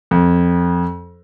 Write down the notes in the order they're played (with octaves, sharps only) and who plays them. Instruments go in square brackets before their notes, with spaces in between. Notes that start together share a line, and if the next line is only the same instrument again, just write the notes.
[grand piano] F2